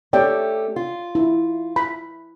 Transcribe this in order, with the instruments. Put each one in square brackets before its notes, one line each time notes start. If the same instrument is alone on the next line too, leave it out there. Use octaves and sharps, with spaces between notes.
[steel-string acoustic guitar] A3 C#4 G4 [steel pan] C#5 D5 G5
[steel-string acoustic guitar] F4
[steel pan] E4
B5